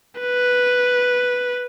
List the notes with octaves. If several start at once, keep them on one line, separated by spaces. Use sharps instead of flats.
B4